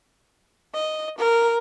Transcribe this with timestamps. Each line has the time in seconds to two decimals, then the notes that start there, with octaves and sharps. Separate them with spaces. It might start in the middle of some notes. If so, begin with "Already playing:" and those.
0.75 D#5
1.18 A#4